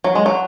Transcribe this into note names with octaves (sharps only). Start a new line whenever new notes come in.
F#3
G#3
F#3